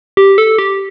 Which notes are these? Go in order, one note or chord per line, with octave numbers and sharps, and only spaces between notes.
G4
A4
G4